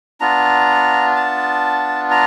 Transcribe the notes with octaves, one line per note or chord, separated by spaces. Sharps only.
B3 D4 F4 A#5
A5
A#5